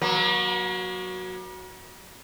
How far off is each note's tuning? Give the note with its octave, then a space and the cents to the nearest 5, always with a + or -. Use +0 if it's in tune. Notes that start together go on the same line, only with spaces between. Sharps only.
F#3 +0 A#3 +45